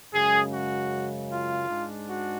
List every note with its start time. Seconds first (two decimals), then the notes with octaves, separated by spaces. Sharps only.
0.13 F#2 C#3 G#3 G#4
0.52 F#4
1.30 F4
1.69 G#2 G#3 D4
2.08 F#4